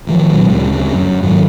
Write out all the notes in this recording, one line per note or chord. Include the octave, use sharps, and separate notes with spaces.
A1 D#3 F3
B1 A#2 F#3 G#3
D2 C#3 G3
F#2
G#2 D#3 F#3